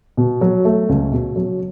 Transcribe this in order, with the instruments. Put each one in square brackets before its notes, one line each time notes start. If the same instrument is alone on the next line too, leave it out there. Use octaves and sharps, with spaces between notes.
[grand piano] B2
F#3
A3
C#2
B2
F#3